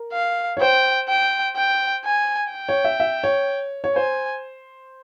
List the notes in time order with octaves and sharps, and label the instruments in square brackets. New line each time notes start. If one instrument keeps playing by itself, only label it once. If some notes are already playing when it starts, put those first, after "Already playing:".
Already playing: [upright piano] A#4
[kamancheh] F5
[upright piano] C#5
[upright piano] C5 [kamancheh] G5
[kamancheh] G5
G5
G#5
G5
[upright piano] C#5
E5
E5
C#5
C#5
[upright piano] C5 [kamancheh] G#5